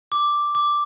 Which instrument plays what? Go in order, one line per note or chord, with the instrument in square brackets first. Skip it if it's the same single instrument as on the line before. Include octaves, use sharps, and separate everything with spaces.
[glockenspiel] D6
D6